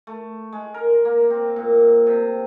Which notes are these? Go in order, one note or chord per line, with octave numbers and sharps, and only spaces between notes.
A3
G#3
A#4
A#3
C4
A#2
C3